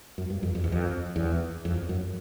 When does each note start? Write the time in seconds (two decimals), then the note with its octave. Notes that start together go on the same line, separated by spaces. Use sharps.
0.18 F#2
0.30 G2
0.43 F2
0.55 F2
0.64 E2
0.72 F2
1.16 E2
1.65 F2
1.89 F#2